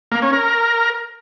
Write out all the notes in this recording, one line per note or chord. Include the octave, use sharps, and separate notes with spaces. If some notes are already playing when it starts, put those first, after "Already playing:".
A#3
C#4
A#4